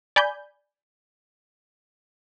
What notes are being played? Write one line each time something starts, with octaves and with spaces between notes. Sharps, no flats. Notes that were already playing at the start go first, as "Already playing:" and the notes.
D5 G#5 B5 G6